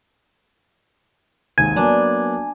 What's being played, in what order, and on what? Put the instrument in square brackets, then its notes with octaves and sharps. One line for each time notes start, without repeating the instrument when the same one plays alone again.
[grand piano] G#1 D#2 G#2 [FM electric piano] G#5
[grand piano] F#3 A#3 B3 [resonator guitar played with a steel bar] D4